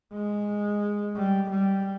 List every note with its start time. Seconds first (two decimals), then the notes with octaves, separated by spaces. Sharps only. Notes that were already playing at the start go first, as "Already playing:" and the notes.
0.13 G#3
1.16 G3
1.50 G3